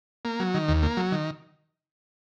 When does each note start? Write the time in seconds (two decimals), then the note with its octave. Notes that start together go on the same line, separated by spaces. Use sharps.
0.25 A#3
0.40 F#3
0.54 D#3
0.68 D#2
0.83 A#3
0.97 F#3
1.12 D#3